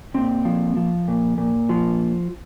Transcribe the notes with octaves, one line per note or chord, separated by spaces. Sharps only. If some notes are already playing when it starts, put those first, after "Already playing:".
A#2 C4
F3
F3
A#2
A#2
F3